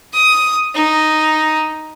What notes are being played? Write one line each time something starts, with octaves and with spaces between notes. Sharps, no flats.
D#6
D#4